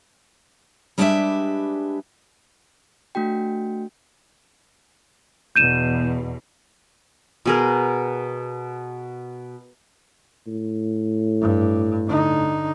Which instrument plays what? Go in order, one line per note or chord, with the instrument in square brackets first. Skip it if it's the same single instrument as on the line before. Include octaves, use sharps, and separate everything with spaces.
[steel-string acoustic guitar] G3 G#3 D4 G4 B4 E5
[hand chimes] A3 D4 F#4 G5
[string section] E2 B2 [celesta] G6 D#7 E7
[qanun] B2 G#4 A#4
[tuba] A2
[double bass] G2
D3 D#4